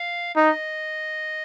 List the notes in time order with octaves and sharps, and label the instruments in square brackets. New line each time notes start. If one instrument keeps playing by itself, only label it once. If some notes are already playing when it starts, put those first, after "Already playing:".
Already playing: [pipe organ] F5
[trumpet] D#4 [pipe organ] D#5